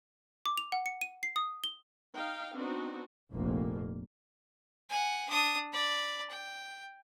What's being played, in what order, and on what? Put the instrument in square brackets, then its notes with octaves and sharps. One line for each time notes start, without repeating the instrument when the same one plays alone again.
[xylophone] D6
F7
F#5
C#7
D#7
C7
D#6
G7
[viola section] D#4 F5 G5
B3 C4 D4 D#4 F#4
[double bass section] F1 A#1 F2 A#3
[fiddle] F#5 G#5
D4 D#6
D5 B5
G5